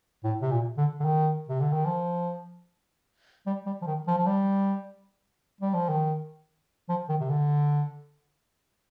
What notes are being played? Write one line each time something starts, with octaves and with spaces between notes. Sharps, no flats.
A2
C3
A#2
D3
D3
D#3
C3
D3
D#3
F3
G3
G3
F3
D#3
F3
F3
G3
G3
F3
D#3
F3
D#3
C3
D3